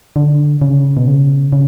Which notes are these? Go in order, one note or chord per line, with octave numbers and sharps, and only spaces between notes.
D3
C#3
B2
C#3
C#3